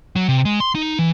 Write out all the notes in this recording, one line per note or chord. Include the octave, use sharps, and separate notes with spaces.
F#3
C3
G#3
C6
D#4
E3